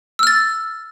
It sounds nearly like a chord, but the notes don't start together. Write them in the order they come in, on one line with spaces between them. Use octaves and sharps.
E6 F6 A6